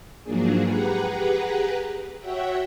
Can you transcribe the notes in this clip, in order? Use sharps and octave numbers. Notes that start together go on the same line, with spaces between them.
G#2 F3 F#3 A#3 D4 G#4
G4 G#4 B4 F#5 A#5
F#4 C#5 E5 F#5 G5